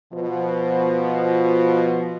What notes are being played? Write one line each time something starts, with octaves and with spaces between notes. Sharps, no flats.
B2 F3